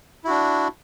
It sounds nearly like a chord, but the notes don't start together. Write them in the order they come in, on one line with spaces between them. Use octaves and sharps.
E4 F#4 D4